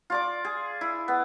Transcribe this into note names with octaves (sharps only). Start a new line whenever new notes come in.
F4 D5 D6
G#4
E4
B3